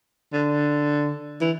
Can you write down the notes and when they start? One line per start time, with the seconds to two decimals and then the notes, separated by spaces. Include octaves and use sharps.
0.33 D3
1.41 E3